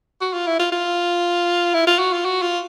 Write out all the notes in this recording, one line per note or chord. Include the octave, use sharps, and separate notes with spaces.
F#4
F4
E4
F4
F4
E4
F4
F#4
F4
F#4
F4